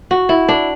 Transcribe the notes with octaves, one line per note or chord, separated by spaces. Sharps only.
F#4
E4
D4